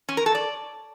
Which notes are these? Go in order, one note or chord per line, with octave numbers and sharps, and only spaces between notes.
C#4
A#4
A4
D5